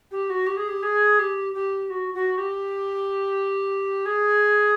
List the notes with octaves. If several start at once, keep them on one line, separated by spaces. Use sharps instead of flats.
G4
F#4
G4
G#4
G4
G#4
G4
G4
F#4
F#4
G4
G#4